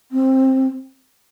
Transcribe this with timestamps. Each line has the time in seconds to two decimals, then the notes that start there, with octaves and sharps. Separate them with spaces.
0.12 C4